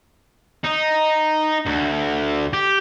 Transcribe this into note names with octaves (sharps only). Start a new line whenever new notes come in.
D#4
D2
G4